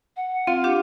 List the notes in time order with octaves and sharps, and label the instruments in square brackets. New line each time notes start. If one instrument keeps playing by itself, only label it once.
[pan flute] F#5
[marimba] C4 [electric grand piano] F4 F5
[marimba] D4 G4